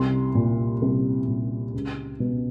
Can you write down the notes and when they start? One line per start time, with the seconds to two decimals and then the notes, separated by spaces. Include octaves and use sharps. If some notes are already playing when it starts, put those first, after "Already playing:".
Already playing: C2 C6
0.35 A#2
0.82 C2
1.27 A#2
1.74 C#2
2.20 B2